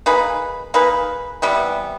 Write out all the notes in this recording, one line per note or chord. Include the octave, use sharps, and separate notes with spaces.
A#3 D#4 G#4 B4
A#3 D#4 G#4 B4
C3 E3 G3 B3